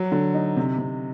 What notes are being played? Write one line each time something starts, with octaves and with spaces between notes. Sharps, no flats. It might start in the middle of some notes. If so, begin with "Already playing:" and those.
Already playing: F#3
D3
D#4
C3
C3